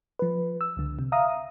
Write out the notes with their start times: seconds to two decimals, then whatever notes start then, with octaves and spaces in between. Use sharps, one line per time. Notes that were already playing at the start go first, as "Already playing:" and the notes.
0.19 F3 B4
0.61 E6
0.77 C#2 D3
0.99 C3
1.12 E5 F5 A#5 D#6